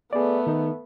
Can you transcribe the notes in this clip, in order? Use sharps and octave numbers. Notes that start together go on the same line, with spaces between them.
A3 B3 G#4 D5
D#3 D#4